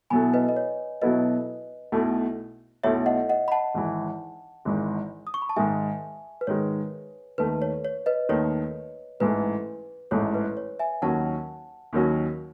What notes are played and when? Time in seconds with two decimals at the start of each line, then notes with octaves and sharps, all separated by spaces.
0.10 B2 F#3 B3 E4 A4 G#5 B5
0.34 B4 D#5
0.49 D#5
0.56 C#5
1.02 B2 F#3 B3 E4 A4 B4 D#5
1.92 B1 B2 A3 E4 A4
2.84 B1 B2 A3 E4 A4 C#5 E5
3.06 D#5 F#5
3.29 D#5 F#5
3.48 B5
3.52 F#5 A5
3.74 G#1 G#2 E3
4.65 G#1 G#2 E3
5.27 D#6
5.34 C#6
5.42 B5
5.49 A5
5.56 G#2 D#3 G#3 E5 G#5
6.41 B4
6.47 G#2 D#3 G#3 C#5
7.38 D#2 D#3 A3 B4
7.62 C#5
7.85 C#5
8.06 B4 D#5
8.29 D#2 D#3 A3 C#5
9.20 A1 G#2 E3 A3 B4
10.11 A1 G#2 E3 A3 C#5
10.34 B4
10.57 C#5
10.79 E5 G#5
11.02 D#2 D#3 F#3 C#4 F#4 F#5 A5
11.93 D#2 D#3 F#3 C#4 F#4